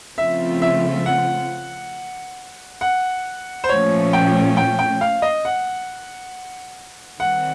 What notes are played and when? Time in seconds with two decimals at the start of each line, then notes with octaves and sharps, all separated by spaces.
0.17 C#3 F3 A3 C4 F4 E5
0.62 E5
1.06 F#5
2.81 F#5
3.64 C5
3.69 A#2 F3 A3 C#4 C#5
4.13 G5
4.57 G5
4.79 G5
5.01 F5
5.22 D#5
5.45 F#5
7.20 D#3 G3 C4 F#5